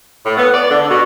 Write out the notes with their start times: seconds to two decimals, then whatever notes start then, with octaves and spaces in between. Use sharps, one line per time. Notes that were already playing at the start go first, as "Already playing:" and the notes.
0.25 A2
0.37 B3
0.53 D5
0.70 D3
0.90 B2